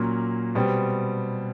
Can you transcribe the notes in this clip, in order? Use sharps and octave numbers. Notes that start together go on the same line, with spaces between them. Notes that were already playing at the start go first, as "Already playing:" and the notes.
Already playing: A#2 F#3 A#3 C#4
B2 G3 C4